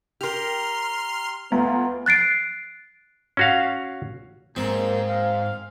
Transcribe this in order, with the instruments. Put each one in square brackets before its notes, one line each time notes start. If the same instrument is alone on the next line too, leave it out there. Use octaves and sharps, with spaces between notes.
[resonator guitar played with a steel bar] G4 A#4 [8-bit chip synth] C6 F6
[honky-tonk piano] D2 F4 A#5 [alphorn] B3
[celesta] F#6 A6 C7 D7
[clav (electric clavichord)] C#4 F#4 F5
[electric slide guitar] G#2 [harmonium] A#3 [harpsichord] C4
[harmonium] F5